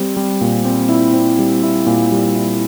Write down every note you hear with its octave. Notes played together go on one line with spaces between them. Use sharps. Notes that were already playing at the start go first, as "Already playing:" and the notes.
Already playing: G3 C4
G3
A#2
C4
E4
C4
G3
E4
A#2
G3
E4